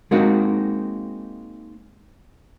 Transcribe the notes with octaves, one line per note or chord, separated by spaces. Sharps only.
G#3 A#3 C4 D#4 F#4